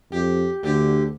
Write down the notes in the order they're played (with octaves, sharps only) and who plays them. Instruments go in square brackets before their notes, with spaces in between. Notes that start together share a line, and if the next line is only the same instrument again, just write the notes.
[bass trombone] F2 [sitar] G4
[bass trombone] D2 [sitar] D3 G4